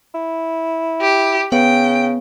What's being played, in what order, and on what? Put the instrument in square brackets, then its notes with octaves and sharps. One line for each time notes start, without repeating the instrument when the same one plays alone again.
[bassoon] E4
[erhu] G4
[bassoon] C#3 [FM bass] B3 [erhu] G5